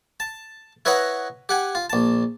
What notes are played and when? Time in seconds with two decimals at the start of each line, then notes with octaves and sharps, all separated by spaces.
0.20 A5
0.85 E4 B4 C#5 D#5 F#5 A#5
1.49 G4 F#5 G#5
1.75 F4
1.90 A#1 A5